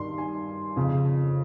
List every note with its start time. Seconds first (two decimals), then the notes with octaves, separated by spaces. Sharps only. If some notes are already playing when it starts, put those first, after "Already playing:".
Already playing: G2 D#3 C6
0.18 G#5
0.76 F2 C#3 F3